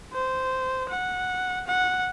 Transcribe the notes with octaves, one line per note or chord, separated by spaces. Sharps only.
C5
F#5
F#5